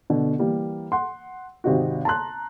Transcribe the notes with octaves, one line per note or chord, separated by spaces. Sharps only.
B2 D3
E3 G3 A#3
F#5 C6
G#1 C3 D#4 F#4
A5 A#5 C6 F#6